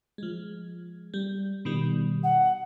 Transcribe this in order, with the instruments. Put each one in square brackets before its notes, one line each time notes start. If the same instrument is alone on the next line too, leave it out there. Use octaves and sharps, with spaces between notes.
[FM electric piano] F3 G#3
G3
B2 D#3 G3
[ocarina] F#5